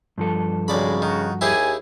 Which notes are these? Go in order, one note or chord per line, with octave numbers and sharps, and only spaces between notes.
G2 F3 A4
B1 C#3 G#3 D5 B5
D#3 F#4
D#2 E4 G4 G#4 G#5